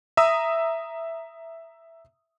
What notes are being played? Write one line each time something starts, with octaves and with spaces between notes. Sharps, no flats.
E5 A#5 D#6 E6